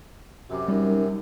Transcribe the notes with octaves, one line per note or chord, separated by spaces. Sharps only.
F#2 C3 F#4 D6
G3 C#4 D#4 A#4